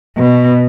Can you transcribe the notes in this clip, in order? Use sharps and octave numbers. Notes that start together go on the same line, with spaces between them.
B2